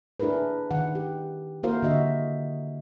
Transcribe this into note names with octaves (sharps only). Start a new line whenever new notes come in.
D4 E4 G#4 A#4 B4
D#3 F#5
G4
A#3 E4 F#4 A#4 C5 F5
D3 F#4 D#5 E5